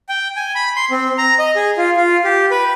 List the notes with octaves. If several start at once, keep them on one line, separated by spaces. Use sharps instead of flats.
G5
G#5
B5
C6
C4
A#5
D#5
G#4
F4
F4
G4
B4